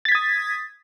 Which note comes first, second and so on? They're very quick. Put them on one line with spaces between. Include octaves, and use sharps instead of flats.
A6 B6 G#6 D#6